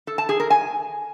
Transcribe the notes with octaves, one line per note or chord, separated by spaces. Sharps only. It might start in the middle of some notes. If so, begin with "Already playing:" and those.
A4
A5
G#4
A#4
G#5